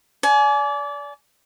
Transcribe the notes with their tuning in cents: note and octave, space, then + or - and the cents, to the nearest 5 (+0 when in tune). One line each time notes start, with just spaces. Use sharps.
D5 -25 G#5 +30